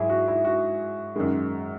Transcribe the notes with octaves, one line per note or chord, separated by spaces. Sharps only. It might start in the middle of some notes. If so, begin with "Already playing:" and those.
Already playing: G#2 F#3 E4 G#4
F#4
E4
F#4
F#2 D#3 G#3